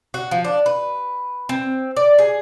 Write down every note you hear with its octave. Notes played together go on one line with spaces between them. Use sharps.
F#4
F3
D4
B4
C4
D5
G#4